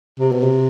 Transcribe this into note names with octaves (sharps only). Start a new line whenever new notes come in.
C3
B2
C3